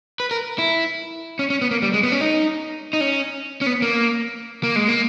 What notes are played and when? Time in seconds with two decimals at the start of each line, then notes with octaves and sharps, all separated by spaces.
0.20 B4
0.31 A#4
0.59 E4
1.39 C#4
1.50 C#4
1.61 B3
1.71 A#3
1.82 G3
1.94 G#3
2.03 B3
2.12 C#4
2.21 D#4
2.93 D#4
3.01 C#4
3.61 C#4
3.67 B3
3.82 A#3
4.63 A#3
4.76 G#3
4.88 A#3